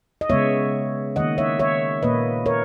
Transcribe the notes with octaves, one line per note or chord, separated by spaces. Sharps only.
D#5
C#3 G#3 B3 C#5 E5
D#3 A#3 D#5 F#5
C#5 E5
C#5 E5
A#2 A#3 B4 D#5
A#4 C#5